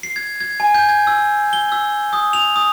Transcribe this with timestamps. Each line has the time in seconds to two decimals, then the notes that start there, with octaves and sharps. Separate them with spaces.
0.03 C7
0.16 G#6
0.40 G#6
0.60 G#5
0.75 G6
0.89 G#6
1.07 E6
1.53 G7
1.72 E6
2.13 D#6
2.33 F7
2.56 D#6